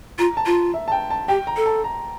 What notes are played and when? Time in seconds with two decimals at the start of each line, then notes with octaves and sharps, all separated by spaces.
0.19 F4 A#5
0.37 A5
0.46 F4
0.74 E5
0.88 A5
0.92 G5
1.10 A5
1.28 G4 G5
1.47 A#5
1.57 A4
1.66 A5
1.84 A#5